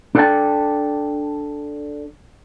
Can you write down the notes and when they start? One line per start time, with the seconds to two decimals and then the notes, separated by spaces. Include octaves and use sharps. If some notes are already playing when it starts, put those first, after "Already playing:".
0.15 D4 A4 D5 F5 G5 A5